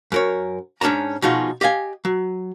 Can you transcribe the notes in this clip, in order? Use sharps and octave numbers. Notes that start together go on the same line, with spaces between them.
F#2 A#4 C#5
G#2 C#4 D4 A5 A#5
B2 F3 D#4 F4 F#4 G#4
G4 D#5 F5 G#5
F#3